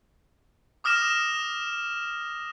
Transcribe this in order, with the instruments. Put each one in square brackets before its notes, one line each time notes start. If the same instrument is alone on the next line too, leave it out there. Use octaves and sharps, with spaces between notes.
[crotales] D6 D#6 F6 A#6 E7